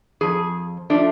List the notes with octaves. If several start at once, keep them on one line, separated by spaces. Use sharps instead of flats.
F2 F3 G#4
F3 A3 D4